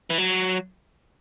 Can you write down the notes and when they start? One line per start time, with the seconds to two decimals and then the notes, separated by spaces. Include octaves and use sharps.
0.10 E3
0.18 F#3